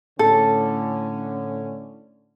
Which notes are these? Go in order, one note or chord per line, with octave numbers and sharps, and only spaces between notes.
A2 D3 C#4 A4